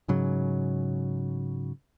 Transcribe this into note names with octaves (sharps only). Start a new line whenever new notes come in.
G#2 C#3 F#3